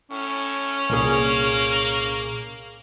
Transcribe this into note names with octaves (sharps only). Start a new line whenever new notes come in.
A2 C#4
C2 A#2 A#3 G#4